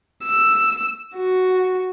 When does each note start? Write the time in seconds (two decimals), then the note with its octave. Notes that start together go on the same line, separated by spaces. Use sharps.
0.24 E6
1.16 F#4